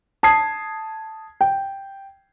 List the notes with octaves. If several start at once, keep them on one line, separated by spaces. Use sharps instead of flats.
A5 D#6 G#6 C7
G5